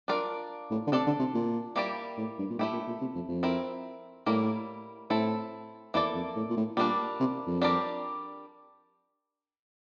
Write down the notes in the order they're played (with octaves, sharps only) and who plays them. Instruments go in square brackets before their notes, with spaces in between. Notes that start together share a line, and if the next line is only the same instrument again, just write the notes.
[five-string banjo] D4 F4 A#4 D5
[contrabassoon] A2
D3
[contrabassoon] C3 [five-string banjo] D4 A4 D5
[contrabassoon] D3
C3
A#2
[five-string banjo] G3 A#3 E4 G4 D5
[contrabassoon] A2
G2
A#2
[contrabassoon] A2 [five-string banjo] A3 E4 G4
[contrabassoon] A#2
A#2
C3
F2
F2
[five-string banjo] C4 E4 A#4
[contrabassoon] A2 [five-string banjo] G3 A#3 E4 A#4
[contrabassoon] A2 [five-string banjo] C4 E4 A4
[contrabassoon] E2 [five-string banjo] A#3 E4 A4 D5
[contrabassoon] F2
A2
A#2
A2
[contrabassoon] A#2 [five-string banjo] G3 A#3 D4
[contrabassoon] C3
F2
[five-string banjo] G3 D4 G4 A#4 D5